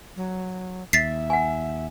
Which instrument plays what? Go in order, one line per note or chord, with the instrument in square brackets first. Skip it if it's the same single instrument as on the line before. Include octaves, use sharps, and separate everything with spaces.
[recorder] F#3
[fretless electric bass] D#2 [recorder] E5 [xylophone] A6 B6 C7
[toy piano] F#5 G#5